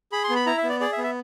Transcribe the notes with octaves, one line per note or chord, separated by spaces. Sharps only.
G#4 B5
C6
B3
B5
E4 A#5
E5
B3
D5
G#4 D5
E5
B3
E5